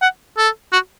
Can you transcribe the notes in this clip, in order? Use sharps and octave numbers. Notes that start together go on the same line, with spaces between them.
F#5
A4
F#4